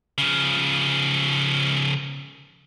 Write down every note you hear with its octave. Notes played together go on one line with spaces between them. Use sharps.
C#3 F3